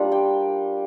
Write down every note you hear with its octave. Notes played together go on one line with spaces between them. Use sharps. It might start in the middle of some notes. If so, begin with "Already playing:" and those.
Already playing: G3 A#3 D4 F4
G5